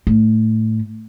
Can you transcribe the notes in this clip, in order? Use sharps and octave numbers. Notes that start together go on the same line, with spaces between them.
A2